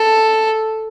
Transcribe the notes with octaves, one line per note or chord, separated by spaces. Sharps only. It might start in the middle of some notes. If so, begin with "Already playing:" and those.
Already playing: A4